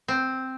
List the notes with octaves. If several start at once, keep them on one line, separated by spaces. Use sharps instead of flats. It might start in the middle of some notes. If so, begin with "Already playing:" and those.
C4